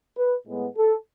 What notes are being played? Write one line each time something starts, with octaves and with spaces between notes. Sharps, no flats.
B4
A2 G#3 B3
A4